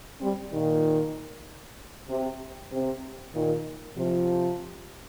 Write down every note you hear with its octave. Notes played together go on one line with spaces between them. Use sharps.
G3 C4
A#2 D#3
C3
C3
A#2 D#3
C3 F3